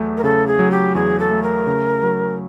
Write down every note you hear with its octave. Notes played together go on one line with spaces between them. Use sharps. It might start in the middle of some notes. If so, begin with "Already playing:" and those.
Already playing: E2 F#3 A3
A#4
C#3 A4
G#4
F#3
G4
E2 G#4
A4
A3
A#4
C#3
F#3